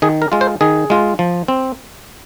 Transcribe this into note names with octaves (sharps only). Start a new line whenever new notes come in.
D#3 G#4
A#4
G#3 F4
C5
D#3 G#4
G#3 F4
F3
C4